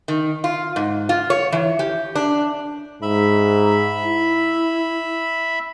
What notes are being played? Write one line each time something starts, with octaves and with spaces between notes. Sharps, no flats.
D#3
F4
G#2
F4
C#5
E3
G4
D4
G#2 E5 B5
E4